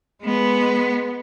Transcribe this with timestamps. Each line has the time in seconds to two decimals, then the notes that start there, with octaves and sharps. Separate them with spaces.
0.23 G#3 B3